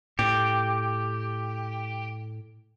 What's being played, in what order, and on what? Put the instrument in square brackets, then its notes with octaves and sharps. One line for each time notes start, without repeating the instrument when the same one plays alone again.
[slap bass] A2 [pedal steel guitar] G4